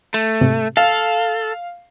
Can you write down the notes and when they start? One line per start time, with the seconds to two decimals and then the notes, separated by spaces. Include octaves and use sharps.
0.14 A3
0.41 G#2 C3
0.77 A4 F5